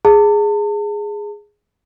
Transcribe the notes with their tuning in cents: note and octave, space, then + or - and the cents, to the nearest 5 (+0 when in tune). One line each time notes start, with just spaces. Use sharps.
G#4 +0 A5 +40